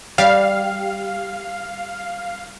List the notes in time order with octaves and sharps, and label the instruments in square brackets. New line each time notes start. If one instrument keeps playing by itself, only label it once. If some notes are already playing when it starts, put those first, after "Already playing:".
[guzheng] G3 [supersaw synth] F5